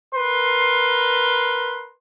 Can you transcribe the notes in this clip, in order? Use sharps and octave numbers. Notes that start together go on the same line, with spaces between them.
A#4 B4 C6